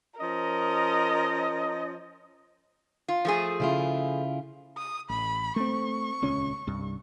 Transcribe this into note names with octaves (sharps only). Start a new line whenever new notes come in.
F3 C#4 A#4 D#5
F4
F3 A3 G#4
C#3 E4 F4
D#6
A1 B5
A3 C4 C#6
D#1 C#2 C#4
C2 G2